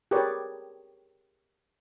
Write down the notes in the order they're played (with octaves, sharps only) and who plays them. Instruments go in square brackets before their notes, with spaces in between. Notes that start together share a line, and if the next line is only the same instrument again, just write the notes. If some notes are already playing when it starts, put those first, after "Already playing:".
[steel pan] G4 G#4 A#4 B4 C#5 D5